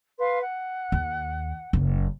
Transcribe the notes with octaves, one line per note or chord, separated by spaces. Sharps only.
B4 F5 C6
F#5
D#2
F#1